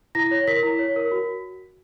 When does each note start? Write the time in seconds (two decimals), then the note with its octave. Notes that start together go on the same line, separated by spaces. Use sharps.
0.15 E4 A#6
0.31 C#5
0.47 A#4 B6
0.63 E4
0.79 C#5
0.96 A#4
1.11 F#4